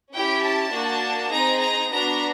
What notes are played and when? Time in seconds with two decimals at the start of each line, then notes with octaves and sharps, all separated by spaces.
0.12 C#4 E4 G4 G5
0.42 A5
0.71 A#3 D4 F#4
1.31 C4 D#4 G#4 A#5
1.60 A#5
1.91 B3 D4 F#4 A#5